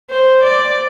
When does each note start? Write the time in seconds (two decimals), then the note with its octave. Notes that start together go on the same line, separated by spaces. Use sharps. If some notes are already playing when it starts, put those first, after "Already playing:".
0.10 C5
0.43 D5